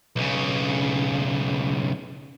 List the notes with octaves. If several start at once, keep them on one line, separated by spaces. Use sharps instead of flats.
B1 C#3